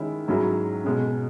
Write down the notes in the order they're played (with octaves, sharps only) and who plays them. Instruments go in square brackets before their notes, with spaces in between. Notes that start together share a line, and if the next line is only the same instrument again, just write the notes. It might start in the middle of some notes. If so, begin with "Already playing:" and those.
Already playing: [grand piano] D#3 G#3 C#4 E4 G#4
G#2 F#3 C#4 E4 G#4
B2 G#3 C#4